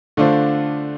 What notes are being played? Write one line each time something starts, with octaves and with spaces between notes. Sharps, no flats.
D3 A3 D4 F4 C5